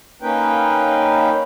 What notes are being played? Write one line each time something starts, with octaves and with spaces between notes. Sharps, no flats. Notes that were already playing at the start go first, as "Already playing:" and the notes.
A#3 C#4 D#4 B4 G5